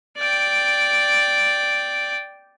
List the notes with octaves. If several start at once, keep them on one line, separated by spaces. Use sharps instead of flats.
D5 G5